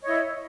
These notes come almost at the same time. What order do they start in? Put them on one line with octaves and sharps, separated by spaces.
C#5 D#5 E4